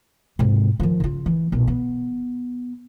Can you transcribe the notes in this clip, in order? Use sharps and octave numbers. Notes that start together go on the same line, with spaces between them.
G#2 C3
D#3 F3
C#3 F4
E3
B1 A#2
B3